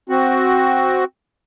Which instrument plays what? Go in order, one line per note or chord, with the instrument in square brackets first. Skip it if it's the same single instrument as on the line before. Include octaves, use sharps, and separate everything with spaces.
[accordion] C4 F#4